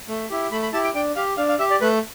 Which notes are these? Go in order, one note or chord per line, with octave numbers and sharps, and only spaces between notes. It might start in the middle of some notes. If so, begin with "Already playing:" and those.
A3
E4 G4
A3 B5
B5
E4 G4 A5
G5
D4 G5
G4 F5
D4 F5
F5
G4 E5
D5
A3 B4